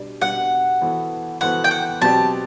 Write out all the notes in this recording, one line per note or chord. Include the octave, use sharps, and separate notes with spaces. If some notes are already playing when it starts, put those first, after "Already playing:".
Already playing: B2 G3 D4
B2 G3 D4 F#5
E3 B3 F#4 A4 C5
E3 B3 F#4 A4 C5 F#5
G5
F#5
B2 F#3 C4 G4 D5 A5